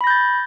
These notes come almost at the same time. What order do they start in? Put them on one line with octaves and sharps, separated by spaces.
B5 A#6 G6 A6